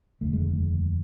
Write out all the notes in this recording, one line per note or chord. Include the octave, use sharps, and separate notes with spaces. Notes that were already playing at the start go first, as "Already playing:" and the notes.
F1 D#2 D3 A3
G#3